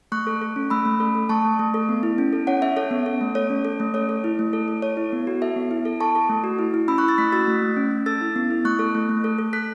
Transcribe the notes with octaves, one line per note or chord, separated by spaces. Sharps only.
A3 C#6 F#6
A4
A4
C#4
A3 B5 E6
A3
A4
A4
A3 A5 C#6
A3
A3
A4
B3
E4
C#4
A4
C#4 C#5 F#5
C#4 E5
A4 C#5
B3
A4
A3
A4 C#5
C#4
A4
A3
A4 C#5
A4
E4
A3
A4
A4
A4 C#5
E4
B3
F#4
A4 E5
B3
E4
A4
A4 A5 C#6
A4
A3
F#4
E4
E4
C#4 B5 E6
C#6 F#6
E4
E6 A6
A3 F#6 B6
F#4 E6 A6
A3
A3
C#4
C#4
A4 E6 A6
E4
B3
E4
A3 C#6 F#6
A4
A3
A3
A4
A4
A4 F#6 B6